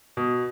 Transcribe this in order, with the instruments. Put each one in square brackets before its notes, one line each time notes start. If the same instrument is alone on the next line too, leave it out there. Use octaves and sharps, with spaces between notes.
[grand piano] B2